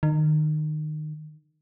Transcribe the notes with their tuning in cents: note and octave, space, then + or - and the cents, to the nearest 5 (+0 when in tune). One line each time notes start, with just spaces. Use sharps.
D#3 -25